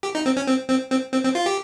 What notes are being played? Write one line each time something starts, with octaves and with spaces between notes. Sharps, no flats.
G4
D#4
C4
C#4
C4
C4
C4
C4
C4
F4
G4